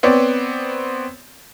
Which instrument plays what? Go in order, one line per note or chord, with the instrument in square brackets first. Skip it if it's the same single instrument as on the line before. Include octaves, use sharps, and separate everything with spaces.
[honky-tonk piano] B3 C4 C#5 D5